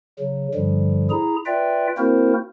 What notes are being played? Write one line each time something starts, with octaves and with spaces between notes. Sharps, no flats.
C#3 F#3
G2 D3 F3 G3
E4 G#4 A#5
F4 B4 D5 E5 G5
A#3 C4 E4 F#4 A#4 C5